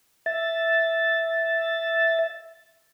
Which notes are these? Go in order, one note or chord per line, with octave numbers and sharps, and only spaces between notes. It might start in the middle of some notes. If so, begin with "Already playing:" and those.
E5 A6